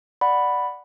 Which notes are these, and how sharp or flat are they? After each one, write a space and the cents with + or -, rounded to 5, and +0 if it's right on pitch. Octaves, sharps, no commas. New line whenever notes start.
D5 +5 F#5 +0 B5 +0